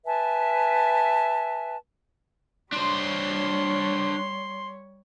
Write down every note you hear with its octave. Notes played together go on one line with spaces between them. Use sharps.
B4 E5 G#5 A5
G3 D4 C5 C#5 C6